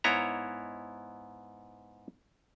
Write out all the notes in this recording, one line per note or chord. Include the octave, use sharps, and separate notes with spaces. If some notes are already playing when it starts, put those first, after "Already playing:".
G#2 B3 E4 C#5 D#5 A#5